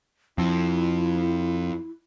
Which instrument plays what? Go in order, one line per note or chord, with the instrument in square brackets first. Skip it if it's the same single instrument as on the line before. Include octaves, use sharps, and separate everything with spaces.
[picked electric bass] F2 [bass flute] E4